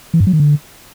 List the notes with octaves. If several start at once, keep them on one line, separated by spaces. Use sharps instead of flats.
E3
G2
F#3
D#3
D3